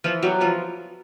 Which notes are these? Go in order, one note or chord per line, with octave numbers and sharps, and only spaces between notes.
E3 F3 F4
F#3 G3 B3 F#4
E3 F3 F4